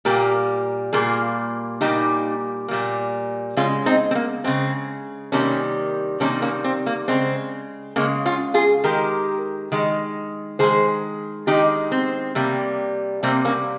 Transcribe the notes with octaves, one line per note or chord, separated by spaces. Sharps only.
A#2 G3 A#3 G4 A#4
A#2 G3 A#3 F4 G#4
A#2 G3 A#3 D#4 G4
A#2 G3 A#3
C#3 G#3 C#4 F4
C4 D#4
C4
A#3
C#3 G#3 C4
C3 D#3 G3 A#3 C#4
C3 D#3 G3 A#3 C#4
A#3 C#4
C4
A#3
C#3 G#3 C4
C#3 G#3 A#3 C#4
C#4 F4
F4 G#4
D#3 G#3 G4 A#4
D#3 G#3
D#3 G#3 G#4 C5
D#3 G#3 D#4 G4
C4
C3 G3 A#3
C3 G3 A#3 C4
A#3 C#4